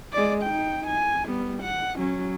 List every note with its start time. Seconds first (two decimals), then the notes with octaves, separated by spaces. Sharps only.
0.13 G#3 D5
0.43 D#4 G5
0.88 G#5
1.27 G3 B3
1.63 F#5
1.98 F#3 C#4